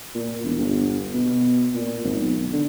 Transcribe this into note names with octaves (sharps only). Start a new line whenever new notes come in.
A#2
E1
G1
B2
A#2
G#1
B1
D3